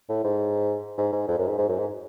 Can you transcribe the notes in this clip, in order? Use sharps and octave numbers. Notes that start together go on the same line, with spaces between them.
A2
G#2
G#2
G#2
F2
F#2
G#2
G#2
F#2
G#2